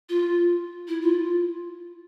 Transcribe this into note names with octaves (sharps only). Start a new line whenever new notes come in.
F4
E4
F4